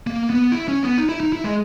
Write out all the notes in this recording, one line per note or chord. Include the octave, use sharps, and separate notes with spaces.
A#3
B3
E4
C#4
B3
D#4
E4
D#4
E4
G#3